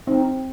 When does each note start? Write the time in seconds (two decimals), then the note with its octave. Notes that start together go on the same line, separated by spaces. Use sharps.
0.07 C4 D#4